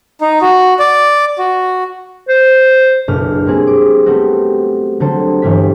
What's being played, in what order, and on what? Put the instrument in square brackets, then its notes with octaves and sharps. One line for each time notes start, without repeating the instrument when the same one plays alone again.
[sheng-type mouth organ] D#4
F#4
D5
F#4
[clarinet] C5
[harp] F#1 B1 D4 B4 F6
G3 G#3 A#3 C4 G#4
D6
G3 A3 B3 C4 F#4
D3 F#3 G3 A4 C5
G1 E3 G3 D4 B6